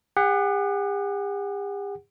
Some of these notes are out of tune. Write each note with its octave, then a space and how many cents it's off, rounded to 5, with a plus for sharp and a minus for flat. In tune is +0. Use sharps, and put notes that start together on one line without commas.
G4 +45 F#5 +5